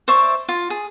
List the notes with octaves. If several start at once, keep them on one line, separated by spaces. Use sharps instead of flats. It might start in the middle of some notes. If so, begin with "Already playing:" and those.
C5 D5 E5 C#6
F4
G#4